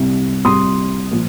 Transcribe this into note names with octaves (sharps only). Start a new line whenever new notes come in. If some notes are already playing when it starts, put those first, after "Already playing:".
Already playing: C2 C3 G3
C2 C3 G3 C6 D#6
A#2 F3